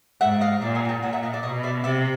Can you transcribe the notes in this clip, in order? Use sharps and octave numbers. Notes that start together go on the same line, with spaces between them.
G#2 E5 F#5
D#5 F5
A#2 D5 E5
F#5 G#5
G#5
G5 A5
A#2 F#5 G#5
E5 F#5
D#5 F5
D5 E5
B2 C#5 D#5
D5 E5
C3 D5 E5